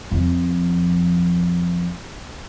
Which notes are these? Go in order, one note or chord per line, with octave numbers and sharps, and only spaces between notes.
F2 F3